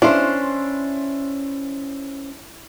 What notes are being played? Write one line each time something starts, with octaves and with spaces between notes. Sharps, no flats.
C#4 D4 E4 C5 F5 C6